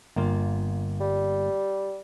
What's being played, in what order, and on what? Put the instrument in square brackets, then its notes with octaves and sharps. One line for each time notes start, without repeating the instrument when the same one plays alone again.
[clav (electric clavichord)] G1 A#3 F4
[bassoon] G3